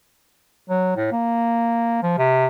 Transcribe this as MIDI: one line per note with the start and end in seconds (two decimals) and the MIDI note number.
0.69 0.93 54
0.96 1.08 45
1.12 1.99 58
2.03 2.13 53
2.18 2.47 48